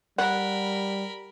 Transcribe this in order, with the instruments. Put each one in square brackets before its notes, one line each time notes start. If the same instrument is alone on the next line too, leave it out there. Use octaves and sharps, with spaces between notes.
[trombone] G3 [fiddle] A#4 B5 [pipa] F#5